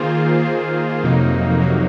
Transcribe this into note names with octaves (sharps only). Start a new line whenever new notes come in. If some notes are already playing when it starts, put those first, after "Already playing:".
Already playing: D#3 A#3 F4 G#4 C5
D#3 A#3 F4 G#4 C5
F2 C3 F#3 A#3 D#4
F2 C3 F#3 A#3 D#4